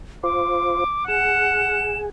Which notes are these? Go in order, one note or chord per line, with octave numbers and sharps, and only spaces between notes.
F4 C5 D6
G#4 F#5 E7